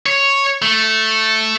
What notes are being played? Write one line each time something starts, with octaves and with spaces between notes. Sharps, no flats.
C#5
A3